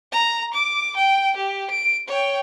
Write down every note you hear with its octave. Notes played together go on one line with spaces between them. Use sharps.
A#5
D6
G5
G4
D7
C#5 G5